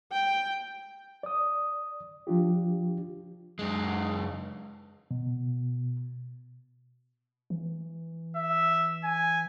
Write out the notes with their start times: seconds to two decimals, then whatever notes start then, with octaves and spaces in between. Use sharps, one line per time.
0.12 G5
1.23 D5 D#6
2.27 F3 D4 F4 G4
3.59 F#2 G#3
5.11 B2
7.50 E3
8.37 E5
9.04 G#5